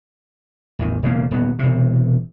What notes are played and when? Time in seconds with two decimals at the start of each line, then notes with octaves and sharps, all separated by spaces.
0.79 A1 E2 D#3
1.03 E1 C#3 A#3
1.31 D#1 B3
1.59 E1 C3